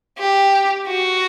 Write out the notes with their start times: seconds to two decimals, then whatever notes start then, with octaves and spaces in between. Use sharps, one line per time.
0.18 G4
0.88 F#4